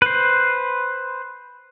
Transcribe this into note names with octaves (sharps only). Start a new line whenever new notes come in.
B4 C5